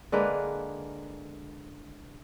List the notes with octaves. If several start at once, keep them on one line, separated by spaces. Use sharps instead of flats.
D3 G#3 A#3 B4